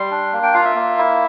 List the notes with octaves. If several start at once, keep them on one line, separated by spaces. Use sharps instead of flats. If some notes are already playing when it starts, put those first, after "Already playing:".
Already playing: G3 C6
D4
A#3
G5
F4 F5
E5
A#3
E4